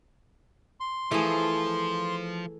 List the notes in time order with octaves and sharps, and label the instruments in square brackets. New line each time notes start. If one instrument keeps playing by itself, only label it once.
[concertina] C6
[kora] E3 [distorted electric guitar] F3 [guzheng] A3 G#4